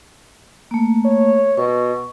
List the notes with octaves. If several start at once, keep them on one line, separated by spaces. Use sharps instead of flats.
A3 A#3
C#5
B2 C#6